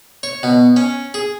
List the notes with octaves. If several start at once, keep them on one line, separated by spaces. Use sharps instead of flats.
C#5
B2
C#4
G#4